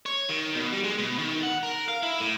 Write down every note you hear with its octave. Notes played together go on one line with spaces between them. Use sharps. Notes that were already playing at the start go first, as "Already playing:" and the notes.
C#5
D#3
B2
G3
G#3
B2
D#3
F#5
A#4
F5
E4
A2